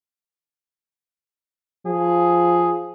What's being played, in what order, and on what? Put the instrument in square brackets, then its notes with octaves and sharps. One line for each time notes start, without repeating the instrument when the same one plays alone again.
[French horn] F3 [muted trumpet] G#4